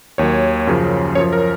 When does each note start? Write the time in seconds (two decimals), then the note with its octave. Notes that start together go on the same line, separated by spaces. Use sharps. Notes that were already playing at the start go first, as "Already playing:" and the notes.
0.18 D#2 D#3 F#3 C#5
0.67 F#2 C#3 F3
1.15 F#2 F3 C#5
1.33 A#4